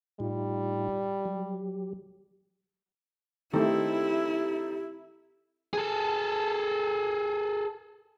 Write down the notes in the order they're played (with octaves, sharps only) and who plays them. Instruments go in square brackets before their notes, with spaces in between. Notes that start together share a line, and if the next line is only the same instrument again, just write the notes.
[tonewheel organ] A2 D#4 F4 [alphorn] G3
[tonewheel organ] F#3 G4
[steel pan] D#3 A3 [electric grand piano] C4 D#4 A4 [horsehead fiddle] E4 [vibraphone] G4
[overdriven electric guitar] G#4 A4